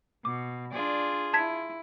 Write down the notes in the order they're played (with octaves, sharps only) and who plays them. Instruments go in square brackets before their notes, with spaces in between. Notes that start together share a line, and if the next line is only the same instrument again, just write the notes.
[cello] B2 [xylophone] D6
[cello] D4 D5 [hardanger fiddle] F4 G#4
[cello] E4 [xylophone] A5 G#6 B6